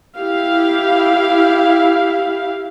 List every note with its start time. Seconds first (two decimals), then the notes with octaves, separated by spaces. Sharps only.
0.18 E4 G4 F5